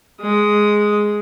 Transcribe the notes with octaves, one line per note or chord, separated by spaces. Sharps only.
G#3 D#6